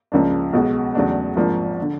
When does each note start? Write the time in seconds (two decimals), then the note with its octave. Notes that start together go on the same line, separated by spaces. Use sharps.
0.12 C#2 C#3 F3 A#3 D4
0.53 B1 B2 G#3
0.95 E2 C#3 F#3 A3 D4
1.36 G#1 G#2 F3 A#3 D4
1.82 D3